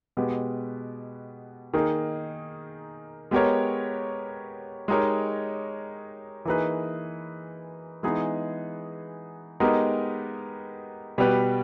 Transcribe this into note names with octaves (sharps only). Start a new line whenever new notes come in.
B2 G#3 B3 G4
D#3 A#3 D#4 G#4
G#3 B3 G4 A#4 C#5
G#3 D#4 G4 A#4 C#5
E3 A#3 D#4 G#4 B4
E3 G#3 B3 D#4 G#4
G#3 B3 D#4 G4 A#4
B2 G3 B3 G4 B4